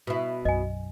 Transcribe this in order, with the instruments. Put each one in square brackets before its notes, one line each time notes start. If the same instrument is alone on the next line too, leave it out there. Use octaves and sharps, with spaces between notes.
[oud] B2 E4
[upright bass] B1 F#2 [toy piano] D#5 G#5